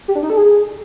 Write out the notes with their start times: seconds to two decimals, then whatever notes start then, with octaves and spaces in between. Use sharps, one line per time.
0.08 G4
0.15 D4
0.23 D#4
0.30 A4
0.37 G#4